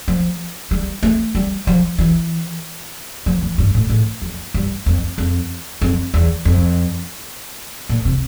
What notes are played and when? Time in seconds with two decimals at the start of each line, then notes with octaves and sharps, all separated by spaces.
0.08 F3
0.71 G3
1.03 A3
1.35 G3
1.67 F3
1.98 E3
3.26 F3
3.42 E3
3.58 G2
3.74 A2
3.90 A2
4.22 F2
4.54 G2
4.86 F2
5.18 F2
5.82 F2
6.14 E2
6.45 F2
7.89 A#2
8.05 C3